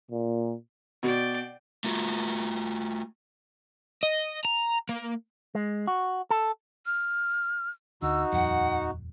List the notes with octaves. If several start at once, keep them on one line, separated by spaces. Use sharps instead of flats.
A#2
B2 D5 G5
A3 F4 F#4
D#5
A#5
A#3
G#3
F#4
A4
F6
D2 D#4 F#4 E6
D#1 F2 F#5